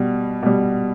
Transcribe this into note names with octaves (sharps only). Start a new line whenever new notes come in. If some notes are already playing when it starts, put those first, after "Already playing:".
Already playing: B2 G3
B2 G3